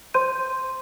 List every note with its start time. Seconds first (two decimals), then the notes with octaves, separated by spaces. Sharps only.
0.14 C5 C6 G6 D#7